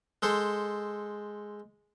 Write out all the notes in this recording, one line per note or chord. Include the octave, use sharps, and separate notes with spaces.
G#3 A4 C5